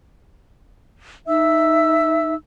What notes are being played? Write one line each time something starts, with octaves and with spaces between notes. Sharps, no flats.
D#4 E5 E6